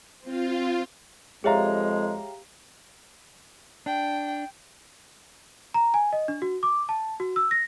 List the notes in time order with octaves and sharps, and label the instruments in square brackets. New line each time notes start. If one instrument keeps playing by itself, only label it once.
[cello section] C4 [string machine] F4
[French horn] F2 [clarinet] G#3 [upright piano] G4 F5 A#5 [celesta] G#4 C#5 E5
[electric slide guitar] D4 [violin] G5
[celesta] A#5
G#5
D#5
D4
F#4
D6
A5
F#4
E6
A#6